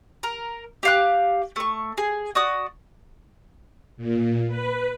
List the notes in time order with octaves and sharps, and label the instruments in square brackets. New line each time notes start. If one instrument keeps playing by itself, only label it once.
[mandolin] A#4
G4 F5 F#6
A3 C#6
G#4
F#4 D5 D#6
[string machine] A#2
B4